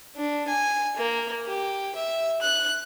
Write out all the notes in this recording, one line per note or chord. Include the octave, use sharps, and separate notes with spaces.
D4
G#5
A#3
G4
E5
F#6